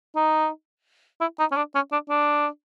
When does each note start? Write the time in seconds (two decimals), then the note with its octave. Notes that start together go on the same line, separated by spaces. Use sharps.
0.16 D#4
1.21 E4
1.39 D#4
1.52 C#4
1.57 D4
1.75 C#4
1.92 D4
2.10 D4